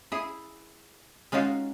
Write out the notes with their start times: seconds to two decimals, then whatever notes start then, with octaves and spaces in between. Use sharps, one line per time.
0.12 E4 G#4
1.32 G#3 C#4 D#4 F4 F#4